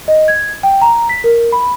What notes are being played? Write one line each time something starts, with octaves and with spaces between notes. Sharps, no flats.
D#5
G#6
G5
A#5
B6
A#4
B5